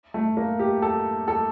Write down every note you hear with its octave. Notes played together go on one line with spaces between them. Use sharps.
A3
A#3
G4
A4
A4